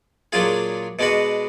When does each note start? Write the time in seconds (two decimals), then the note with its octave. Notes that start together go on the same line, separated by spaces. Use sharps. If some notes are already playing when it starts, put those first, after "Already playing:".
0.32 A#2 F#3 D4 F4 G#4
0.99 B2 G#3 D4 F#4 B4